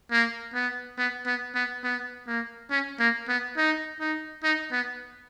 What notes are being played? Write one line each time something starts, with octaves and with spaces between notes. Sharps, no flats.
A#3
B3
B3
B3
B3
B3
A#3
C#4
A#3
B3
D#4
D#4
D#4
B3